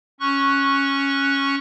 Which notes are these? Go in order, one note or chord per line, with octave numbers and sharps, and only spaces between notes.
C#4 C#6 F#6